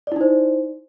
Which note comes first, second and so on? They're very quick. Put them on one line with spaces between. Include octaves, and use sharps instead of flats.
D5 E4 D#4 C5